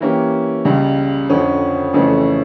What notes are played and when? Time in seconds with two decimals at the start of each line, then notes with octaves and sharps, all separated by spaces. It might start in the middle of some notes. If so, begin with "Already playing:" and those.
0.01 E3 A#3 C#4 G4
0.65 C#2 C#3 G3
1.29 F2 D3 F3 C#4
1.94 F2 C#3 E3 A3 C#4